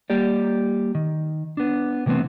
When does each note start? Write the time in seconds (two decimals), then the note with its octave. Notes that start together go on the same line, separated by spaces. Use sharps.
0.10 G3 A#3 G4 D5
0.95 D#3
1.57 B3 D4
2.06 C3 E3 A3 B3 C4